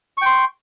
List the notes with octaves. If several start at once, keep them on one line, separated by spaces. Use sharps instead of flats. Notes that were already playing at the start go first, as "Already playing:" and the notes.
G5 C6 C#6